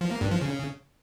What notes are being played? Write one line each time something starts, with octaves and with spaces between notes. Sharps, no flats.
F3
A#3
G2
F3
C#3